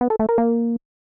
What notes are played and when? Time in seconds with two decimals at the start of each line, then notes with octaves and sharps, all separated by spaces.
0.01 B3
0.10 A4
0.19 A3
0.29 A#4
0.38 A#3